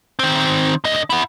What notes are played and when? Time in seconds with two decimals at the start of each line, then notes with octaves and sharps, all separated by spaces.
0.19 D#3 C4
0.84 D3 D#5
1.10 E4 F#5